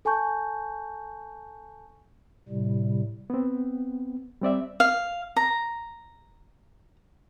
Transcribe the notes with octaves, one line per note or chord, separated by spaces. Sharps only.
A4 G#5 A5 C#6 G6
A2 C3 G3
B3 C4
G3 C4 D5 E5
F5
A#5